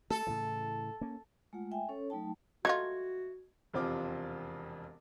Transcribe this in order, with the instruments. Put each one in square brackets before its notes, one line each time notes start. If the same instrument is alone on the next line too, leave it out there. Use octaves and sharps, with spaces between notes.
[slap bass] A3 [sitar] A4
[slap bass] A2 C#3 E3
A#3 C#4
[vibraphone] G#3 A3 F4 F#5
E5 G5 G#5
C#4 A4 C#5
F#3 A3 D#4 G5 A5
[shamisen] F#3 A3 F4 [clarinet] F#4 [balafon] D#5 [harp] G#6
[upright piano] E1 F2 C3 C4 F4 D6